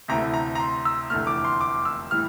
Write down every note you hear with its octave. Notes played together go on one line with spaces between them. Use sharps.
D2 C3 E3 A3 A#5
A#5
A#5
C6
E6
F1 E2 D3 A3 F6
D6
C6
D6
E6
A2 E3 G3 F6